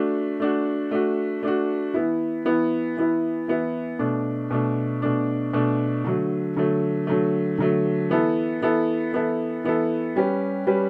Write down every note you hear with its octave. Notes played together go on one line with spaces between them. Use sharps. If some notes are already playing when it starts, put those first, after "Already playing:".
Already playing: A3 D4 F#4
A3 D4 F#4
A3 D4 F#4
A3 D4 F#4
E3 B3 E4
E3 B3 E4
E3 B3 E4
E3 B3 E4
B2 A3 D4
B2 A3 D4
B2 A3 D4
B2 A3 D4
D3 F#3 A3
D3 F#3 A3
D3 F#3 A3
D3 F#3 A3
E3 B3 E4 A4
E3 B3 E4 A4
E3 B3 E4 A4
E3 B3 E4 A4
G3 C#4 G4 B4
G3 C#4 G4 B4